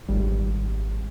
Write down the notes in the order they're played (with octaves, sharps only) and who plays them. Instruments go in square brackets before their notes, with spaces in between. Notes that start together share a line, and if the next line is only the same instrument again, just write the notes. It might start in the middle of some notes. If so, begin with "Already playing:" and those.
[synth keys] G#1 G3